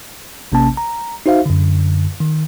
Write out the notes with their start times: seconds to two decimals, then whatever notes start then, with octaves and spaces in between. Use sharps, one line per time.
0.52 A1 C3 A#3 C#4 A5
0.77 A#5
1.26 D#4 F#4 C5 E5 F5
1.46 F#2 D3
2.20 D#3